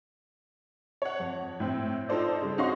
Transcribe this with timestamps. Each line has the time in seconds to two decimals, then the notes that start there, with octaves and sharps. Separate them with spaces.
1.02 C#5 F#5
1.20 F2
1.60 A2 C4
2.09 D#4 F4 A4 C5 D5
2.42 C#3 G3
2.58 C#4 D#4 F#4 F5 C6 C#6